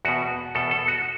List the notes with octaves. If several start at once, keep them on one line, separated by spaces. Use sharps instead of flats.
E2 B2 F#4
E2 B2 A4
A4
F#4